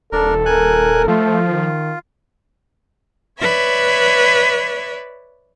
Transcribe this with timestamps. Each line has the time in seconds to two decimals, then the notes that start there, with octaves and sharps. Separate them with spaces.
0.12 D#1 D4 A4 A#4
0.46 A#4 G#5 F#6
1.08 F3 A3 F4
1.46 D#3
3.39 B4 C#5 D5 E5